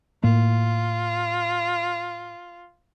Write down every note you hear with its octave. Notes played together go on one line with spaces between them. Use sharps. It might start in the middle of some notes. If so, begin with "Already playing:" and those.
A2 A#3 F4